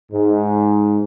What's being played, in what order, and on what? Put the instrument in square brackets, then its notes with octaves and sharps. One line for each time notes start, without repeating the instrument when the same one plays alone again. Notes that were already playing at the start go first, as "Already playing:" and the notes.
[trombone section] G#2